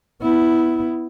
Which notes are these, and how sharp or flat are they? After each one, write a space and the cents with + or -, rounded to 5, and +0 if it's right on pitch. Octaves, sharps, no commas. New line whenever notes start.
B3 +10 E4 -5